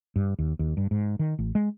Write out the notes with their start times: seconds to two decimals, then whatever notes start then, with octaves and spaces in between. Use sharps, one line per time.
0.16 G2
0.39 D#2
0.59 D#2
0.77 G2
0.91 G#2
1.19 D#3
1.39 A1
1.55 G#3